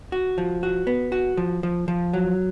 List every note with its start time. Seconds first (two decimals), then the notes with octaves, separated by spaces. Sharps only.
0.12 F#4
0.38 F3
0.63 F#4
0.87 B3
1.12 F#4
1.37 F3
1.63 F3
1.88 F3
2.13 F#3